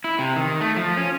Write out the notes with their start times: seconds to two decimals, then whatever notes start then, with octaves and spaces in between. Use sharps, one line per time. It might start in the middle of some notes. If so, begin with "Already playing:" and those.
0.04 E4
0.19 C3
0.36 D#3
0.61 A3
0.77 F3
0.97 C#4